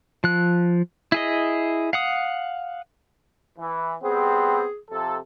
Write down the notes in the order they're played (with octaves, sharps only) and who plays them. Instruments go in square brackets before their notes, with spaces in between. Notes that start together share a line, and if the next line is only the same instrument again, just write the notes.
[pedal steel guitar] F3 F#6
E4 G#4 D#5
F5 F#5 D#6
[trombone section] E3
[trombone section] G3 B3 C4 [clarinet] G#4
[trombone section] C3 F3 A4